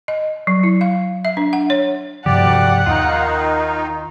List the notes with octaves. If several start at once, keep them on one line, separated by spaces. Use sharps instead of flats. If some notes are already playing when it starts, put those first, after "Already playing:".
D#5
F#3
E4
F5
E5
D4
F#5
C#5
D2 G2 C3 F3 G4 D5 F#5
D#2 D#3 D#4 F4